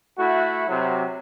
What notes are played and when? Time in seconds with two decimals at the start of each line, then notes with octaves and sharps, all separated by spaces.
0.17 A3 E4 F#4
0.68 C3 F#3